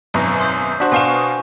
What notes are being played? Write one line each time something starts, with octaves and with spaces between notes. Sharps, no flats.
G#1 F#2 B2 A#5
C6 D#6 G6
D4 F#4 C5 B6
B2 F5 G#5 C#6 E7